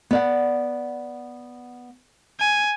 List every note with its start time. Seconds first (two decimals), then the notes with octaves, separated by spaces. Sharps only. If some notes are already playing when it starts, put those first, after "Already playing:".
0.11 B3 D5 F#5
2.40 G#5